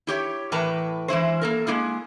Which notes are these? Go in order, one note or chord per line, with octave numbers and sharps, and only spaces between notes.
E4 G4 C#5
A2 E3 A#4 B4 A5 A#5
E3 G#3 E4 C5
A#3 A4 A#4
G#3 A#3 E4 G#4